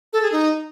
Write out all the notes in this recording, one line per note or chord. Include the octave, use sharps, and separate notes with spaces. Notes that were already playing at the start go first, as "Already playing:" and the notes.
A4
G#4
D#4